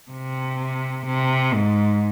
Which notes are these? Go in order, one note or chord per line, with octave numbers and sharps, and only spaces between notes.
C3
C3
G#2